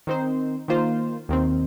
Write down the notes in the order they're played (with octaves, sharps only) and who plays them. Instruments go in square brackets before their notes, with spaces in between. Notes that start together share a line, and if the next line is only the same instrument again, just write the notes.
[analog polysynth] D#3 C4 D#4 C5
D#3 A#3 F4 C5
D#2 D#3 C4